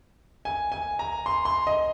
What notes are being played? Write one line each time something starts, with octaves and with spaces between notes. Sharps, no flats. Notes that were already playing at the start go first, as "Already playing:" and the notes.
G#5
G#5
A#5
C6
C6
D#5